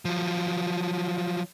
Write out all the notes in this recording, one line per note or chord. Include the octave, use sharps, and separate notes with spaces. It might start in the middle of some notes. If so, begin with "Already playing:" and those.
F3 F#3